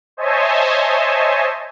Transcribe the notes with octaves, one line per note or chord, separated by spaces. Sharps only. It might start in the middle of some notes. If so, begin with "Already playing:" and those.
C5 C#5 D#5 E5 G#5 A5